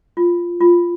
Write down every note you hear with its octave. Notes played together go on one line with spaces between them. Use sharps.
F4
F4